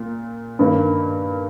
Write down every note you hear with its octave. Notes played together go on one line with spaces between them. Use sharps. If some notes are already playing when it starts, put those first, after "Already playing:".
Already playing: A#2
G2 D#3 A#3